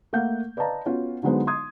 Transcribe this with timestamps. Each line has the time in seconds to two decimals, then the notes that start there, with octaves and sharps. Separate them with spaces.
0.13 A3 A#3 F5 F#5 G6
0.57 B4 D5 D#5 F5 A5 A#5
0.86 B3 C#4 F4 F#4
1.23 D3 F#3 G#3 B3 D#4 C5
1.47 C6 D#6 G#6